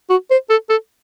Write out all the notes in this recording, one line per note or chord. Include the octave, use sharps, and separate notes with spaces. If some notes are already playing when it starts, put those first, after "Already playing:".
F#4
C5
A4
A4